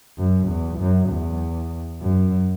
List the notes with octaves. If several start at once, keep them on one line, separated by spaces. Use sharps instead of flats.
F#2
E2
F#2
E2
F#2